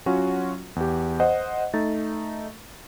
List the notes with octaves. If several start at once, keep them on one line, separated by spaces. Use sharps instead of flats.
F#3 C#4 F4 F#4
E2 G4
C5 D#5 F#5
A3 D#4 A6